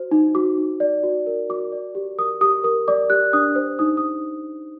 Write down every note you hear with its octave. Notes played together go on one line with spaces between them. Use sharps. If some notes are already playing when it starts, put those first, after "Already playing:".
Already playing: F#4 C5
D#4
F#4 D6
D#4
D5
F#4
A#4
F#4 D6
D5
G4
A#4 D#6
G4 D#6
A#4 D#6
D5 D6
G4 F#6
D4 D#6
C5
D#4 D#6
D#6